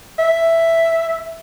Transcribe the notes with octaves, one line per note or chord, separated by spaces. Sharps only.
E5